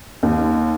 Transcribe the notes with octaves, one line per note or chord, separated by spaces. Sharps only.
D#2